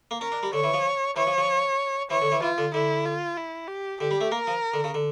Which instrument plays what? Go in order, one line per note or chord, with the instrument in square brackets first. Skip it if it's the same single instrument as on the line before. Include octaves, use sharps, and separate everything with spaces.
[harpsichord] A#3
[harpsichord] C#4 [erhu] A#4
[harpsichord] D4
G3
[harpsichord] D3 [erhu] C#5
[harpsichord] E3
F3
[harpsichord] E3 [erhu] C#5
[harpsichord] F3
F3
[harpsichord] E3 [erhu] C#5
[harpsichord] D3
E3
[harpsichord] E3 [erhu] F4
[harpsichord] D3
[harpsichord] D3 [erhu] E4
[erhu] F4
E4
G4
[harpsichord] D3 [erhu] G4
[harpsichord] G3
A3
[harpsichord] A#3 [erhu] A#4
[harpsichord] F3
D3
C#3
D3